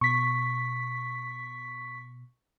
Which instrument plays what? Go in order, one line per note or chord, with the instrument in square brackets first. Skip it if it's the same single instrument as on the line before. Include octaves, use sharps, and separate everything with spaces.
[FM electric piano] B2 [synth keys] C#6 B6